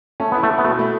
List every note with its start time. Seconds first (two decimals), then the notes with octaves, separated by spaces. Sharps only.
0.20 A3 C#4
0.32 B3 E4
0.43 A3
0.50 E4
0.58 B3
0.64 B2 A3
0.79 A3